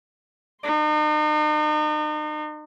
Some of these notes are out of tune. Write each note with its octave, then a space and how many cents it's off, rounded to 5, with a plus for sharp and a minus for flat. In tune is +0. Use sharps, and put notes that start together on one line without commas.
D#4 -40 C6 +0